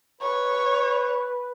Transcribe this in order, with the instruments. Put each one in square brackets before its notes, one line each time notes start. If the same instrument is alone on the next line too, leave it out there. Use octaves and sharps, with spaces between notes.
[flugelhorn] B4 [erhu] C#5